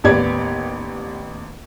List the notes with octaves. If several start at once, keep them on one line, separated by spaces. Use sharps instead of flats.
A1 D#2 B3 G4 D5 G#6